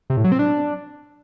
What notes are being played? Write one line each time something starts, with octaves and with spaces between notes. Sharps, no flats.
C3
A2
F#3
C4
D4